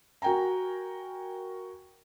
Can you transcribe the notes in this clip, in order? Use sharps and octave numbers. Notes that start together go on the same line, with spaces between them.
F#4 A#4 G5 G#5 A#5